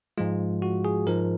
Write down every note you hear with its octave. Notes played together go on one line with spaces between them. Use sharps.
G#2 F3 G#3 F4
F#4
G#4
G#2 F3 G#3 A#4